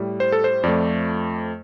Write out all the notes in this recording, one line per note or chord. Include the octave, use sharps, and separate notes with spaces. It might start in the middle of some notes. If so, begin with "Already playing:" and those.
Already playing: A2 G3
C5
A4
C5
F2 F3 A3 D5